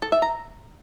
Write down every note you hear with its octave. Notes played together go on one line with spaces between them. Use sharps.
A4
E5
A#5